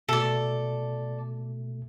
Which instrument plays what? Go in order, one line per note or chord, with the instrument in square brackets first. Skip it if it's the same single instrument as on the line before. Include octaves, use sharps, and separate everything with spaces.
[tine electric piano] B2 A3 [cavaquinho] A4 D5